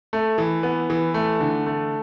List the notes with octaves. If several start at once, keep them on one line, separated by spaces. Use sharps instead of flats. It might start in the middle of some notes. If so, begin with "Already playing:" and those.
A3
E3
B3
E3
A3
D3
A3